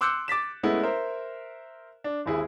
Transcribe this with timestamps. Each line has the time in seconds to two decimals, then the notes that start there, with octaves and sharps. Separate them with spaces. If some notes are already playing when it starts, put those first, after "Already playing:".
0.01 C6 D6 E6 F#6 G6 C#7
0.28 D6 A6 B6 E7
0.63 G#3 A3 B3 C#4 E4
0.83 A#4 C5 E5
2.04 D4
2.26 G#1 D#2 E4 G#4